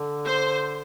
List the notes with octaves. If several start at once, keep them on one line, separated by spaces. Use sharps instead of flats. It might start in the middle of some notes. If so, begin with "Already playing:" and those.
Already playing: D3
C5